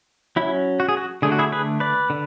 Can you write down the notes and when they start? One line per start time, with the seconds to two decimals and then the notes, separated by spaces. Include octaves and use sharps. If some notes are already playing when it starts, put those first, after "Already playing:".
0.36 F#3 C#4 E4
0.80 F#4
0.89 G#4
0.97 F#4
1.22 D3 A3 D4 G#4
1.32 F#4
1.39 E4 G#4
1.52 G#4 B4
1.80 B4 D5
2.10 D3